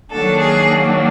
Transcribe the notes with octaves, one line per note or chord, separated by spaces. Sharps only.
D#3 F#3 A#3 D4 A4
G#4